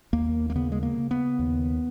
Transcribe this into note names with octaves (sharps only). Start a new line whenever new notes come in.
D#2 A#3
A#3
C#3 B3
G#3
A#3
C#3
B3
D#2